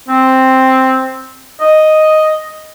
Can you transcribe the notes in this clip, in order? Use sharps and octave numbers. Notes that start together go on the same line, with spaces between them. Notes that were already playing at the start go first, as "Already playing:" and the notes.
C4
D#5